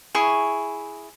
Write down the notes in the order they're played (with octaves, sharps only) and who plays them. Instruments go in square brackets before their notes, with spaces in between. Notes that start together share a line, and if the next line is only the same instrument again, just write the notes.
[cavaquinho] E4 G#4 C#6